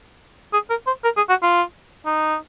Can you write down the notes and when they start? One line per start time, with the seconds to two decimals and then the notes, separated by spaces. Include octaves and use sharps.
0.53 G#4
0.70 A#4
0.87 C5
1.04 A#4
1.17 G#4
1.29 F#4
1.43 F4
2.06 D#4